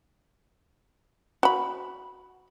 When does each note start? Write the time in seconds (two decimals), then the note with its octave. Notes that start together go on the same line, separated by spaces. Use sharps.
1.43 F#4 B5